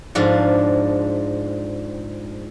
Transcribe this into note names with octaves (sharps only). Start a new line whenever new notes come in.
G#2 F3 D4